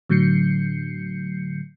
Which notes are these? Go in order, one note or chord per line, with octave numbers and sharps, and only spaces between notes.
A2 D3 F#3 G6 C7 C#7